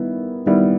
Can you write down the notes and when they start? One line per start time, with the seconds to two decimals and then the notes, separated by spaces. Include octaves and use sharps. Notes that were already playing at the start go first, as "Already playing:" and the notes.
Already playing: D#3 G3 B3 E4
0.46 D#3 G3 B3 E4